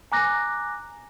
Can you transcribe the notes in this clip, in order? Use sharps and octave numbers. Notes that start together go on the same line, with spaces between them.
G#5 A#5 D6 F#6 A#6